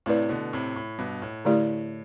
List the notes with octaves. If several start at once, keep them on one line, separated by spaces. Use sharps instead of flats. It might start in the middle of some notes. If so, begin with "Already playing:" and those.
A2 C3 A3 E4 B4 D5
B2 D3
A2 C3
A2
G2 B2
A2
D3 A3 E4 G4 D5